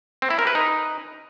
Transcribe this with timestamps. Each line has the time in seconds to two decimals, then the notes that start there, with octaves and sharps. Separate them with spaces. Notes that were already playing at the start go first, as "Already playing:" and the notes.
0.22 C4
0.30 E4
0.39 A#4
0.47 B4
0.55 D#4